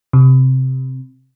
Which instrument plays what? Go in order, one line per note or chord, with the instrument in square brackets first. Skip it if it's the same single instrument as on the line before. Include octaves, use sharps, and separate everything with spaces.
[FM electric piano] C3